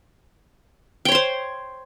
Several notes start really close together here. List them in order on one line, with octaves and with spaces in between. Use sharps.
G5 C#5 C6 C5